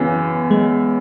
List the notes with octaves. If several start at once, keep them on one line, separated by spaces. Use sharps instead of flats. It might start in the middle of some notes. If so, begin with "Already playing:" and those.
Already playing: F#2 C#3 E3 B3
G#3